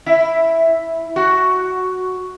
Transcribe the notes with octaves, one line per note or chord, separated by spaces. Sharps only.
E4
F#4